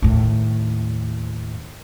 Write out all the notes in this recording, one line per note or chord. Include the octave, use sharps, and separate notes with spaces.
D#2 A2